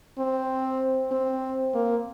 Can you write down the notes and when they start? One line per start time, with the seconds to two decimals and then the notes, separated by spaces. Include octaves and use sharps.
0.18 C4
1.11 C4
1.74 A#3